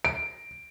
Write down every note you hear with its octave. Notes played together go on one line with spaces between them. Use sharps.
D7